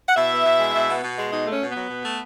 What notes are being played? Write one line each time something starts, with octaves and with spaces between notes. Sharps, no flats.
F#5
B2 E4 E5
B3
B2
G#3
B2
B3
B2
G#3
B2 D#4 D#5
A3 C#4 C#5
B2
F#3 B3 B4
B2
A3